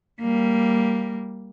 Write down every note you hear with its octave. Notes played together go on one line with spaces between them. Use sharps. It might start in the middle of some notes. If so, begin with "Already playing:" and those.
G3 A#3